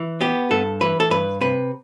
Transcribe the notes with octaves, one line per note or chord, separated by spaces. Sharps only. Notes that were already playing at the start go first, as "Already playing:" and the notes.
Already playing: E3
B3 G4
G2 A4
E3 B4
A4
G2 B4
C3 B4